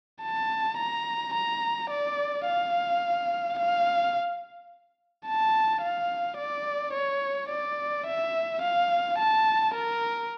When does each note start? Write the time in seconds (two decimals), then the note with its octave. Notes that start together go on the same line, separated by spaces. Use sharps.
0.22 A5
0.77 A#5
1.34 A#5
1.90 D5
2.46 F5
3.58 F5
5.26 A5
5.82 F5
6.38 D5
6.93 C#5
7.49 D5
8.06 E5
8.62 F5
9.19 A5
9.74 A#4